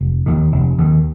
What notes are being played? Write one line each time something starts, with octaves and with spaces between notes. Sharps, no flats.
F1
D#2 D#3
F1
D#2 D#3